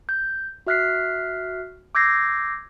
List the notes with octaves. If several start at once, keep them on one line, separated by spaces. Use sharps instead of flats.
G6
F#4 E5 F6 F#6 B6 C7
D6 E6 G6 G#6 A#6 C7